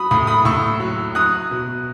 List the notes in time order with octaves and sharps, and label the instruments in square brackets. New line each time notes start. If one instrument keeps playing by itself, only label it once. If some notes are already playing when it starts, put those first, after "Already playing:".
Already playing: [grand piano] F#3 B5 D#6
A2 B5 D#6
B5 D#6
A2 C#6 E6
F#3
F#3 D#6 F#6
B2